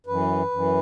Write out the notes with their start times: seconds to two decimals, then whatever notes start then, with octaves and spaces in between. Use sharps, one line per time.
0.06 F#2 E3 B4
0.51 F#2 E3